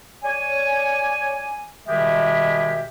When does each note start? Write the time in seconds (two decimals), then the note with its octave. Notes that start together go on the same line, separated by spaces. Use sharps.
0.23 C#5 D5 G#5
1.87 B2 D#3 G3 G#3 G4 E5